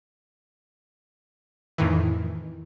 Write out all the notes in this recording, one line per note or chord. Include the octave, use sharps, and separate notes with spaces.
F2 A2 D#3 E3